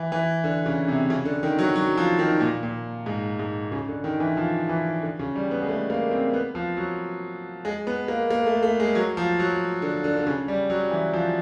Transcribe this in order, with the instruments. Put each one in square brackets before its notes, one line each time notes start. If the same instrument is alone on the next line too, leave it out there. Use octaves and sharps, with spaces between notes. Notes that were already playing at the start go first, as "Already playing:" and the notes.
Already playing: [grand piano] E3
E3
D3
C#3
C3
C#3
D3
D#3
F#3
F#3
F3
D#3
A#2
A#2
G#2
G#2
C#3
D3
D#3
E3
F3
E3
D3
C#3
G3
B3
G#3
A3
A#3
C4
B3
F3
F#3
G#3
B3
A#3
A#3
A3
A3
G#3
F#3
F3
F#3
D3
D3
D3
C#3
G3
F#3
E3
F3